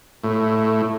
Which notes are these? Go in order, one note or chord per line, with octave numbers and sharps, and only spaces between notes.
A2